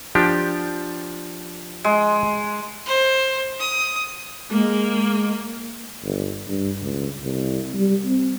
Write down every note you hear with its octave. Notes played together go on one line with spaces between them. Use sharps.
F3 D4 G4
G#3
C5
D#6
G#3 A#3
G1
G2
C#2
C2
G3
C4